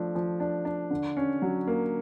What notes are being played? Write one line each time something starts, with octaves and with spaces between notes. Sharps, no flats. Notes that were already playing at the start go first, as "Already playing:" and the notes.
Already playing: F3 A3 D4
F3
D4
D4
D3
C#4
F#3
A#3